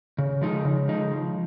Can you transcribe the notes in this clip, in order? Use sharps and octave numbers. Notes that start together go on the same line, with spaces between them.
C#3
F3 G#3 D#4
C#3
F3 G#3 D#4
F3